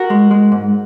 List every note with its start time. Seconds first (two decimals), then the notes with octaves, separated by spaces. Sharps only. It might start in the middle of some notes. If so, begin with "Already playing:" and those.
Already playing: F#4 A#4
0.10 G#3
0.31 G#3
0.52 G#2